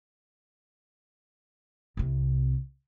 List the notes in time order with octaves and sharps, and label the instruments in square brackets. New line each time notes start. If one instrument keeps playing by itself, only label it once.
[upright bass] C2 C3